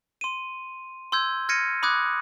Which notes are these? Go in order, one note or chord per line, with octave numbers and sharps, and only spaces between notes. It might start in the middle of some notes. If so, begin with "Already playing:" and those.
C6 D#7
C6 E6 G6 G#6
F6 G#6 A#6 C#7 D#7
B5 D6 D#6 F#6 G#6